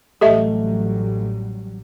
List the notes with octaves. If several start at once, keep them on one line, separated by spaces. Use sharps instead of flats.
A1 F#3 G3 A3 G4 D#5 E5